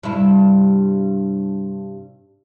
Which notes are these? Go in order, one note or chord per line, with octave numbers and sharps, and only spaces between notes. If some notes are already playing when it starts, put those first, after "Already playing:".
G2 C3 E4